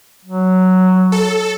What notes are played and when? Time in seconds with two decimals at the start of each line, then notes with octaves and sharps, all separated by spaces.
0.25 F#3
1.12 A4